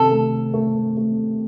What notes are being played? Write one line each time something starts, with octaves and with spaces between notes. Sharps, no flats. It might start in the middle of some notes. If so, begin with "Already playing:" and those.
Already playing: C3 D#3 A4
A3
A3
A3